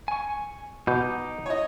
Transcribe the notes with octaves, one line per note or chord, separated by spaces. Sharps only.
G#5 C#6
B2 D#4 D6 G6
C#5 D#5